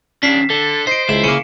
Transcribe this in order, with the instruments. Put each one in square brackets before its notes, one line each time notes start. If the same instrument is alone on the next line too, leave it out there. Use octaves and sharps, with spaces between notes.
[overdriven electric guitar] D#3 C#4 [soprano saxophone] D4 [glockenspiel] B6 C7 E7
[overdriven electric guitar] D3 [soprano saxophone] A4
[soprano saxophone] C5 [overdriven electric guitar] D#5 [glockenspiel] C7 D7
[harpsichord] C#2 [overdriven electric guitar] E4 [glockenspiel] E7
[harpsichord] C#3 A#3 [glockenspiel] C#7